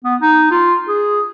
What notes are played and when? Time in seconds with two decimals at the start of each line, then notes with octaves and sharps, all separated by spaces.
0.05 B3
0.22 D#4
0.51 F4
0.88 G#4